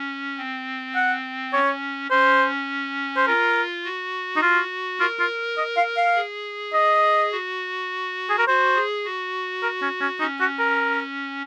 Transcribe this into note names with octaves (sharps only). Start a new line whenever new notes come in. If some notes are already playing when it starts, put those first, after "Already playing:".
Already playing: C#4
C4
F#5
C#4 C#5
C#4 C5
C5
F4 A#4
F#4
D#4
F4
F4 A#4
F4
D#5
F5
F5
G#4
D#5
F#4
G#4
A#4
F#4 C5
G#4
F#4
A#4
C#4
C#4
C#4 D#4
F#4
A#4